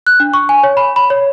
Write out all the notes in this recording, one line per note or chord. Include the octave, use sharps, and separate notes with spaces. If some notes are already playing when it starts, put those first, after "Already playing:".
F#6
D4
C#6
G#5
C#5
B5
B5
C#5